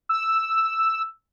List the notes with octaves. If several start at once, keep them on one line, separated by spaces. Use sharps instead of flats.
E6